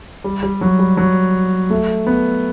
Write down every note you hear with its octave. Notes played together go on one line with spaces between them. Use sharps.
G3
G3
F#3
G3
F#3
A3
B3